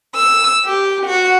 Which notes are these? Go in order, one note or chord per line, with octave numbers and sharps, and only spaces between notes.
E6
G4
F#4